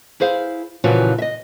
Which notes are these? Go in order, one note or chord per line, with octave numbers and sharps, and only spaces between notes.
E4 G#4 C5 F5
A#2 C#3 E3 F3 F#4
D#5 E5